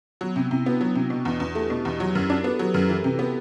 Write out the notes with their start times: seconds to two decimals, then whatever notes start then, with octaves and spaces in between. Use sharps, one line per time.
0.21 F#3 B3
0.36 C3 B3
0.51 C3 E4
0.66 B3 D4 F#4
0.81 F#3
0.95 C3
1.10 B2
1.25 E2
1.40 E2
1.55 A3 E4 G4
1.70 B2
1.85 E2
2.00 F#3
2.15 F#2
2.30 D4
2.44 B3 F#4 A4
2.59 F#3 G4 B4
2.74 F#2
2.89 E3
3.04 C3
3.19 B3